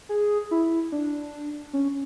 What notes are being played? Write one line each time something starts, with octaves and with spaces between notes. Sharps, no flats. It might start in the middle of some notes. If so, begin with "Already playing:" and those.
G#4
E4
D4
C#4